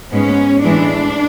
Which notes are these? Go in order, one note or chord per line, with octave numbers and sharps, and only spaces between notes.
G#2 G#3 B3 C#4
A2 E3 G#3 D4